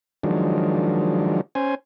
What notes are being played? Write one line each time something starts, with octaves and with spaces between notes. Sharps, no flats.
D#3 F3 F#3 G#3 D4
C#4 C5 G#5